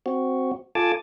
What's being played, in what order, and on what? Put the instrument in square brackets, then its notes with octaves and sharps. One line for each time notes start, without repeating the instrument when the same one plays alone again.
[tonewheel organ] C4 F#4
F4 A4 G#5 A5 D6